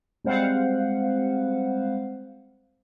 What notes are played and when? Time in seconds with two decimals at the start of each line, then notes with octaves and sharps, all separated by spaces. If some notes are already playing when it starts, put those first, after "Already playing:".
0.24 G3 G#3 C4 C5 F5 F#5